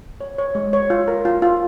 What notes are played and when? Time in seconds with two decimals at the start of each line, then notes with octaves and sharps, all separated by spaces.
0.21 C#5
0.38 C#5
0.55 G#3
0.73 C#5
0.90 F4
1.08 A#4
1.25 F4
1.42 F4